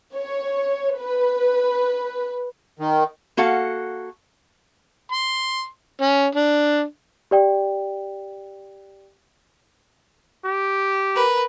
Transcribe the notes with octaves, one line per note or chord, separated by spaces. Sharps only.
C#5
B4
D#3
A#3 F#4 A4 F5 F#5
C6
C#4
D4
G4 D5 G5
G4
A#4 B4